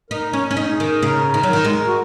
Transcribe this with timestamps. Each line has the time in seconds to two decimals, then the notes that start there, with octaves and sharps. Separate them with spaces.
0.10 D#4 A#4
0.33 C#4
0.51 C#4
0.57 D#4
0.72 G#4
0.80 D#3
1.02 C#3 A#4
1.34 D#3
1.43 F#3
1.53 D#3
1.65 G#3
1.86 F#4